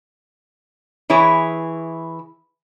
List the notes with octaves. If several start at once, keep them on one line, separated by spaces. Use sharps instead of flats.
E3 E4 G#4 C#5